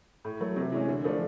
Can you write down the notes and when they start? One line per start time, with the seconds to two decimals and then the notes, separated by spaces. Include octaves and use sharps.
0.25 A2
0.40 F#3 A3
0.56 C3
0.72 E3 G#3 C#4
0.88 D3
1.04 F3 A3 D4